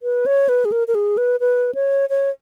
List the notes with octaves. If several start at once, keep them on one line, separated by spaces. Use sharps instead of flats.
B4
C#5
B4
G#4
A#4
A#4
G#4
B4
B4
C#5
C#5